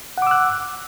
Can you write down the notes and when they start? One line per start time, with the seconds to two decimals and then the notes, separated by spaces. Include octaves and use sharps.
0.18 F#5
0.22 D6
0.27 E6
0.31 F#6